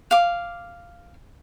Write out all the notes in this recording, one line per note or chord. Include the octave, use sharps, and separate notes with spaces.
F5 D6